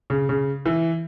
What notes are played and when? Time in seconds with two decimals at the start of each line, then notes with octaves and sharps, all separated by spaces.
0.10 C#3
0.29 C#3
0.66 E3